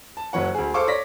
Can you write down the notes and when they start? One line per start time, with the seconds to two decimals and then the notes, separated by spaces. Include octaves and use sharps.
0.17 A5
0.33 F#1 F#3 C#5 F#5
0.55 D2 G#4
0.74 A4 C5 F5 C#6 D6
0.87 C#5 D5 A#6 B6